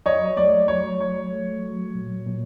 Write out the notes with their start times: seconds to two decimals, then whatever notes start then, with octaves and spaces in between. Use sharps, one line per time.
0.06 F#3 C#5 D#5
0.37 A3 D5
0.68 F#3 C#5
1.00 F#3 C#5
1.31 A3
1.63 F#3
1.95 A#2
2.27 A#2